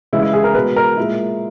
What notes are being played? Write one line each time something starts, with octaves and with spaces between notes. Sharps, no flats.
C#3 E3 G#3 E4
E4
G#4
A#4
B2 G#3 B4
A#4
A#2 G#3 E4